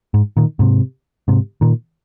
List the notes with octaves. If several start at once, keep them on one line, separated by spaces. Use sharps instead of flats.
G#2
A#2 D#3
G#2 C3
G#2 C3
A#2 D#3